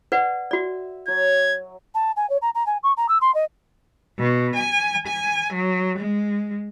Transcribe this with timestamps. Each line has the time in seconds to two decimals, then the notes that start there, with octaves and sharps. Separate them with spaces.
0.12 B4 D5 F#5
0.51 F#4 D5 E5
1.08 F#3 C#5 G#6
1.94 A5
2.16 G#5
2.29 C#5
2.41 A#5
2.54 A#5
2.66 G#5
2.83 C#6
2.96 A#5
3.08 E6
3.21 C6
3.34 D#5
4.19 B2
4.55 G#5
5.07 G#5
5.53 F#3
5.99 G#3